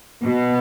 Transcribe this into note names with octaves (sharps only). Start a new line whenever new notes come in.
B2